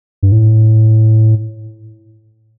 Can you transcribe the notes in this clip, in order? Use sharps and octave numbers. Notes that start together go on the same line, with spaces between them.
G2
A2